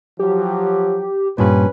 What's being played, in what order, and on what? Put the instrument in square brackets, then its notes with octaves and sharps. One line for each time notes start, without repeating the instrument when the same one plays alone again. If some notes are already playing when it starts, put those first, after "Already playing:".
[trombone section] F3 F#3 [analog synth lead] G4
[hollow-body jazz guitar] G2 A#2 [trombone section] F3 C#4 B4